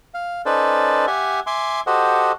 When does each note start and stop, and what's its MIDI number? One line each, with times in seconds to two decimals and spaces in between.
0.14 0.42 77
0.46 1.06 61
0.46 1.06 63
0.46 1.06 69
0.46 1.06 71
0.46 1.06 72
0.46 1.06 74
1.07 1.40 67
1.07 1.40 76
1.07 1.40 78
1.07 1.40 80
1.47 1.81 76
1.47 1.81 80
1.47 1.81 84
1.47 1.81 86
1.87 2.32 66
1.87 2.32 67
1.87 2.32 69
1.87 2.32 72
1.87 2.32 75
1.87 2.32 78